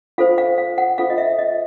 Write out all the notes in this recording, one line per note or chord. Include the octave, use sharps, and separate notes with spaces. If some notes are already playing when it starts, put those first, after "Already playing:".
F4 A4 C5 F5
F5
F5
F#5
F4 A4 C5 F5
D#5
E5
D#5